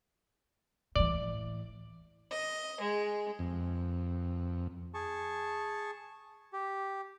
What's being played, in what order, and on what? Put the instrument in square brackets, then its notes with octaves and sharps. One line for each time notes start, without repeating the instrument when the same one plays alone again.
[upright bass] A2 E3 [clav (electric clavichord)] D5
[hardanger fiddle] D#5
G#3
[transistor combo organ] F2
[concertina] G#4 A5 C#6
G4